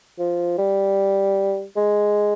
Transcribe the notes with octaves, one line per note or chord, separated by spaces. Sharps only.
F3
G3
G#3